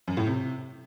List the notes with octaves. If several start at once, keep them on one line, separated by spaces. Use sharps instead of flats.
F#2
A2
C3